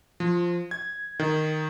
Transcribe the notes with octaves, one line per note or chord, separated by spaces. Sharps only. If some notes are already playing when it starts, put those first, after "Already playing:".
F3
G#6
D#3